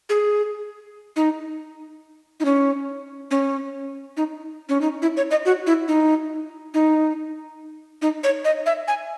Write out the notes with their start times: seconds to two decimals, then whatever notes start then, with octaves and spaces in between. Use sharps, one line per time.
0.09 G#4
1.16 D#4
2.40 D#4
2.45 C#4
3.31 C#4
4.17 D#4
4.69 C#4
4.81 D#4
5.02 E4
5.17 C#5
5.31 D#5
5.45 F#4
5.66 E4
5.88 D#4
6.74 D#4
8.02 D#4
8.24 C#5
8.45 D#5
8.66 E5
8.88 G#5